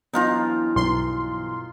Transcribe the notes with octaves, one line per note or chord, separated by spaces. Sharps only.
F2 E3 F#3 B3 D4 D#4 F4 A#5
B1 G2 C6